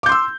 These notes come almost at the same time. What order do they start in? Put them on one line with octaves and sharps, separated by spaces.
D6 G6 C6 E6